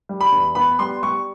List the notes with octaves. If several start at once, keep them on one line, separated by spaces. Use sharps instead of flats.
G3
B5
E2
B3 B5
G3 C6
G3 C#6